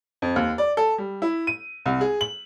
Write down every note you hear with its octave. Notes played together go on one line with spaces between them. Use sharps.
F2
D#2
D5
A4
G3
E4
D#7
C2
G#4
F#7